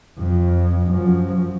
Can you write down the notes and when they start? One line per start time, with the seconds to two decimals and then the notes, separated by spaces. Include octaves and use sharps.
0.18 F2
0.90 F#2 F3